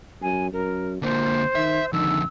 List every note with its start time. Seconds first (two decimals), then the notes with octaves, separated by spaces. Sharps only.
0.22 F#2 G#5
0.53 F#2 A#4
1.03 A#2 D3 A#3 C5
1.55 D#3 E5
1.93 F2 D3 D#3 E6